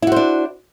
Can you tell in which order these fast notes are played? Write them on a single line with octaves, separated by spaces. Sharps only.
E4 F#4 C5 D4